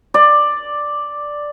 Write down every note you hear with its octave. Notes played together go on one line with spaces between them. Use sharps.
D5